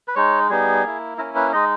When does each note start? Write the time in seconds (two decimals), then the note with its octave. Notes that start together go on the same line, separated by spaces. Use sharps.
0.08 B4
0.15 G#3 D#4 C#5
0.50 G3 B3 D#4 G#4
0.84 A#3 E4
1.18 A#3 C#4 E4 A#4
1.36 B4
1.53 G#3 D#4 D#5